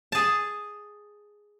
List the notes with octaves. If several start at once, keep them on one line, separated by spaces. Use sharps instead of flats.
G#4 A5